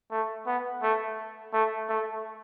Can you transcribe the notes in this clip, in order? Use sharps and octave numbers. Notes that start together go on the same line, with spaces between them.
A3
B3
A3
A3
A3